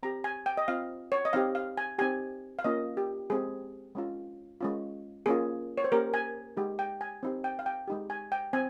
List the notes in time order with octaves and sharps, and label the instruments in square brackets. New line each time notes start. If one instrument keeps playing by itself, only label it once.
[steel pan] C4 G4 A#5
G#5
G5
D#5
C4 F4 F5
C#5
D#5
C4 D#4 G4 F5
F5
G#5
C4 D#4 G4 G#5
F5
A#3 C#4 F4 D#5
G4
G#3 C4 G4 G#4
G#3 C#4 F4
G#3 C#4 F4
A#3 C#4 F4 G#4
C#5
C5
A#3 C#4 G4 A#4
G#5
G#3 D#4 G4
G5
G#5
C4 D#4 G4
G5
F5
G5
G#3 D#4 G4
G#5
G5
C4 G#5